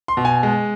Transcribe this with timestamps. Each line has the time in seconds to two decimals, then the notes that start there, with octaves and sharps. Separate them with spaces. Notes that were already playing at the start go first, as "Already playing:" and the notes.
0.08 C6
0.17 B2
0.25 G#5
0.43 G#3